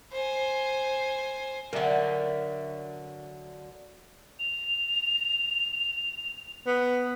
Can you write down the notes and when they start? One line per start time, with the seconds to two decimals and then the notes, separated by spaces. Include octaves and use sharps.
0.12 C5 G#5
1.73 D3 F#3 A#4 D5 E5
4.39 F7
6.67 B3